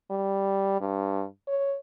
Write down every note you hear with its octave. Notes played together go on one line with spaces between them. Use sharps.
G3
G2
C#5